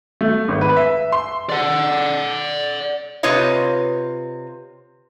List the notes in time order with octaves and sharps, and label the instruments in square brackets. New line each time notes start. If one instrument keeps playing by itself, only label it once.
[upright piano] A3
G#1
B4
E5
C6
[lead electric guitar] D5 F#5
[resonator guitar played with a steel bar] C3 F4 B4 C#5 D#5